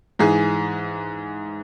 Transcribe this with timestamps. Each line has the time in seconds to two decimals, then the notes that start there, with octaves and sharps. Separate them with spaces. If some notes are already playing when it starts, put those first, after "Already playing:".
0.19 G#2 E3 G#4